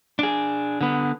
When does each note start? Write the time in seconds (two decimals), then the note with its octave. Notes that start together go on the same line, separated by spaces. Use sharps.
0.19 D4 G#4
0.81 D3 B3